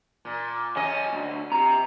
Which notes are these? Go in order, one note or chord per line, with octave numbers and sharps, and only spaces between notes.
A#2
B1 C#4 D#5 G#5
D2
C3 A#5